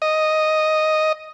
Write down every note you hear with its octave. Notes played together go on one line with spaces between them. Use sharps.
D#5